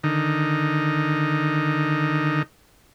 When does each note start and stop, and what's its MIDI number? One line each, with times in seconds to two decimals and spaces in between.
0.04 2.42 50
0.04 2.42 51
0.04 2.42 63